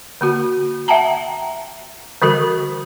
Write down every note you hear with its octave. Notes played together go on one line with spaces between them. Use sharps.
D3 A#3 F#4
E5 F#5 G5 A5 A#5
D3 E3 G3 F#4 A4 A#4